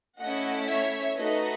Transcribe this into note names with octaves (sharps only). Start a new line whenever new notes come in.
A3 C#4 E4 D#5 F#5
C#5 E5
A3 D#4 F#4 B4 D#5